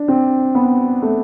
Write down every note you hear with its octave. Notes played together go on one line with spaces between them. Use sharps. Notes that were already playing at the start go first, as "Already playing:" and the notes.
Already playing: D4
C4
B3
A3